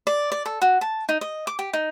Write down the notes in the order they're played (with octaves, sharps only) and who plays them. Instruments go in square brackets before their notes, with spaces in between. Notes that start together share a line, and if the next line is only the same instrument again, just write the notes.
[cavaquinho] D5
D5
A4
F#4
A5
D#4
D#5
D6
G4
D#4